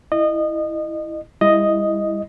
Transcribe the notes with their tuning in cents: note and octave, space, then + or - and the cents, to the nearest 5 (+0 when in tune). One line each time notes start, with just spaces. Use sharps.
E4 +0 D#5 -25
G3 +35 E4 +0 D#5 +0